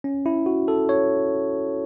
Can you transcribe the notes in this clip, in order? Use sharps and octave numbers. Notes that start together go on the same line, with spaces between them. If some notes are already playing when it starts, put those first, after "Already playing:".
C#4
E4
F#4
A4
C#5